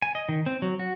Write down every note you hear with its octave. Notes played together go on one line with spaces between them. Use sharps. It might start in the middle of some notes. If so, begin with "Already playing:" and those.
G#5
D#5
D#3
C4
F#3
F#4